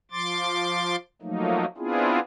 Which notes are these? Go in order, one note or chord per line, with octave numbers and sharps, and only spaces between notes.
F3 C6 D6 A6
F3 F#3 A3 A#3 D#4
B3 C4 D4 E4 F4 G#4